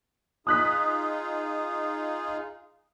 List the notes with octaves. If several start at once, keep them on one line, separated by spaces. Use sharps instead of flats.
D#4 F4 G#4 D#6 F#6 B6